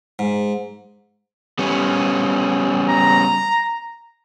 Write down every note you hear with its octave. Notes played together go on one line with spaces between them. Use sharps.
G#2
G3 B3 C#4
A#5